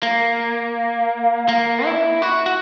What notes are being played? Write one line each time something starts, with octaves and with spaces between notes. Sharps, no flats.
A#3
A#3
E4
F#4
F#4